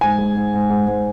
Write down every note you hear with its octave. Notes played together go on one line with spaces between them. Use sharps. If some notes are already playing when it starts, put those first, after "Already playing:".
G#2 G#5
G#3
G#2
G#2
G#2
G#2